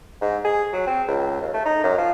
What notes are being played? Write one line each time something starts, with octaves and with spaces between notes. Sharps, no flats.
G#2
G#4
F#3
C4
C#2
D#2
A3
D#4
F#2
F3